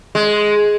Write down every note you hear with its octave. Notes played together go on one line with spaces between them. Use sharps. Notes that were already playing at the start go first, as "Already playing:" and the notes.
G#3